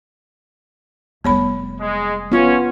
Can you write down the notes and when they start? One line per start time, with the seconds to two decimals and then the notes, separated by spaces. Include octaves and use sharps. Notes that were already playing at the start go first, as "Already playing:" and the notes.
1.24 F1 G3 B3 C#5 B5
1.80 G#3
2.32 B3 C#4 F4